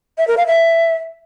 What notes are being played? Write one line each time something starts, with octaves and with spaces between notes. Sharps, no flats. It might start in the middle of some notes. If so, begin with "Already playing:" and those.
E5
A#4
F5
E5